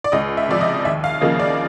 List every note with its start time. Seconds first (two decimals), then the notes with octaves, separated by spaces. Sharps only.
0.04 D5
0.12 C#2 D#5
0.37 E5
0.48 C3 F3 D5
0.61 D#5
0.85 D#2 E5
1.04 F5
1.21 C#3 F3 A#3 D#5
1.39 D5